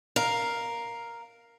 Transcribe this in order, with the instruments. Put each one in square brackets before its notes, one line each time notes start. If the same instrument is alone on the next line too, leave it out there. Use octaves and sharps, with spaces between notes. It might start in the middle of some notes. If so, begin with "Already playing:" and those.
[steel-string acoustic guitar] A#4 F5